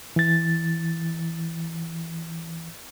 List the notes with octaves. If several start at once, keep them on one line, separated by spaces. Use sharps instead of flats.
E3 A6